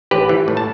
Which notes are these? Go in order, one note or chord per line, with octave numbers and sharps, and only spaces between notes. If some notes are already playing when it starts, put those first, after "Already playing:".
A1 G4 B4
E3
A2
A5